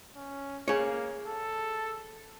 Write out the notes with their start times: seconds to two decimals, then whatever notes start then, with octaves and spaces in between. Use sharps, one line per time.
0.16 C#4
0.68 A#3 G#4 C#5
1.27 A4